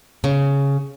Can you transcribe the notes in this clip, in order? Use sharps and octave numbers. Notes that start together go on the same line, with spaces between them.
C#3